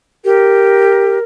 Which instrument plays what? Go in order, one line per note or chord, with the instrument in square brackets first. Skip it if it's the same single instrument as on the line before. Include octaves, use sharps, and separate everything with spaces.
[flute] G4 [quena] A#4